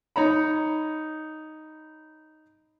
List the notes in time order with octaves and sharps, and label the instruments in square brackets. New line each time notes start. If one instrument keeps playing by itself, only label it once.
[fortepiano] D#4 C#5 A#5 B5